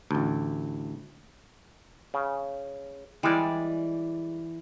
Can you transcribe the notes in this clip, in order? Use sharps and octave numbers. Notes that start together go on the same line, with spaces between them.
A1 D2
C#3
E3 G3 G#3 D5